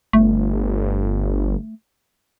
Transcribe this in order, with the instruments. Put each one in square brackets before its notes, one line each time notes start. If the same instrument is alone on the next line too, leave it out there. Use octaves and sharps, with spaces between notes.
[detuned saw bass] G1 [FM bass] A3